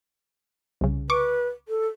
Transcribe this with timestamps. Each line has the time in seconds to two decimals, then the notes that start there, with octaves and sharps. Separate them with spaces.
0.81 C2 C#3
1.10 B4 C#6 D6
1.68 A4